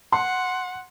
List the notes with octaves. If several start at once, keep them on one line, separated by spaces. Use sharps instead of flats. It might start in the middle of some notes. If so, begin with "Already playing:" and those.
F#5 C6